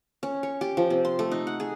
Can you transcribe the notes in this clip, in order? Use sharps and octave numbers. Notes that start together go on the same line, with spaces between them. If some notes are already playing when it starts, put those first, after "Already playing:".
C#4
C#5
G4
F3
C3
C6
A3
D#4
F#5
G#4